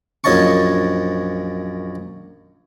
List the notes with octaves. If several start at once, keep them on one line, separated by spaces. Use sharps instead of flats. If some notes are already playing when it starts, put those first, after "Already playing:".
A#1 F#2 C#5 D#5 A5 C#6